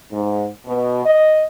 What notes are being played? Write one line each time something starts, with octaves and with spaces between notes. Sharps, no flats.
G#2
B2
D#5